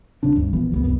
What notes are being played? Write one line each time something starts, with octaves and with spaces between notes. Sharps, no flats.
D1 C#3 C4 D4
D2 G2
A#1 E3 F3 B3
C#2 G3 B3
C2 F#2 B3